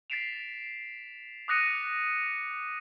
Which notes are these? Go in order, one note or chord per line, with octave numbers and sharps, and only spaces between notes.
A6 B6 C7 D7 E7 F7
D6 D#6 F#6 A#6 C#7 D#7